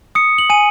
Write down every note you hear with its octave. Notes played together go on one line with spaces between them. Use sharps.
D#6 C#7
F#7
G#5 D#7